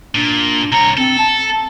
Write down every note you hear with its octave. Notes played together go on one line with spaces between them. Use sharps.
A#2 D4
C2 C#5 A#5
C4 A4
A5